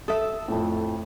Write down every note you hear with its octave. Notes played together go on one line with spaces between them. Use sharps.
A4 E5 D#6
F2 A2